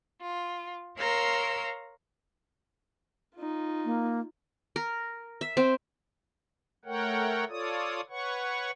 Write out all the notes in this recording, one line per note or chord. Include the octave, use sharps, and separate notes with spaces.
F4
A#4 C#5 F5 A#5 C6 E6
D#4 F4
A#3
A#4
E5
C4
A3 A#4 C#5 F#5 G5
F4 A4 C#5 D5 D#6
B4 C#5 F#5 C#6